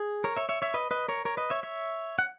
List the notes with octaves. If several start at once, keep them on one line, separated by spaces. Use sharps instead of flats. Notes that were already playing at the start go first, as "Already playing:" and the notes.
Already playing: G#4
A#4 C#5
C#5 E5
C#5 E5
C#5 E5
B4 D#5
B4 D#5
A#4 C#5
A#4 C#5
B4 D#5
C#5 E5
C#5 E5
F#5